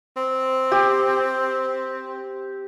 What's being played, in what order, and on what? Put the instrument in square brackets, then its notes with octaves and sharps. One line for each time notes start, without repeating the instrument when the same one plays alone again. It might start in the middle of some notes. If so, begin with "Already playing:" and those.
[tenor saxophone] C4
[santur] G4